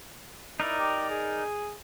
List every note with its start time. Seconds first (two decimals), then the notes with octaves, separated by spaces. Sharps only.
0.60 D#4 E4 A#4 D5
0.79 G4
1.10 G#4